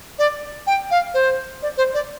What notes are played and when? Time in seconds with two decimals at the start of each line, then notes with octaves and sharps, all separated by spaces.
0.19 D5
0.67 G5
0.91 F5
1.14 C5
1.62 D5
1.77 C5
1.94 D5